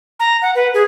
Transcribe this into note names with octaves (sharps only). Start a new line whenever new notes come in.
A#5
F#5
B4
G#4